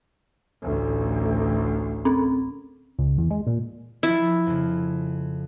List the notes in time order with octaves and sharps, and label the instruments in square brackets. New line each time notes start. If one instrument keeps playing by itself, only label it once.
[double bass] A1 D2
[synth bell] C4 C#4
[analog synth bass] C#2
E2
G#3
A#2
[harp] F3 F4 [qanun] E4
[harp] F2 C#3